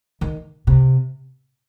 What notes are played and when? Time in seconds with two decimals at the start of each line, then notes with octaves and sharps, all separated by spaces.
0.21 D#3
0.67 C3